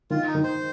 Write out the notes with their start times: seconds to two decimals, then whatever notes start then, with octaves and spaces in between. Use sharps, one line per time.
0.10 D#3 F4
0.27 D#4
0.35 D#3
0.43 C5